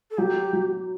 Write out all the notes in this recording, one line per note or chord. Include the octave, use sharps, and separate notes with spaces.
A4
F#3 G4
F#3